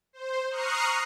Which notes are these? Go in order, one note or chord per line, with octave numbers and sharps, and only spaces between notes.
C5
A#5 C#6 D#6 F6 F#6 C7